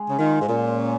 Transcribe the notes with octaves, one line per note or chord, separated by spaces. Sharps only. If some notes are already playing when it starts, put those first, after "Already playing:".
Already playing: G#3 G#4
C#3
D#3 F4
G#2
A#2 C#3
C#4